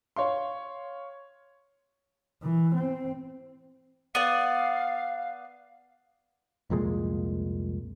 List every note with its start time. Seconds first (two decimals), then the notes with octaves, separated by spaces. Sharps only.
0.16 C#5 F5 C6
2.42 E3
2.75 C4
4.15 B3 D5 F5
6.70 C2 F2 A#2 G#3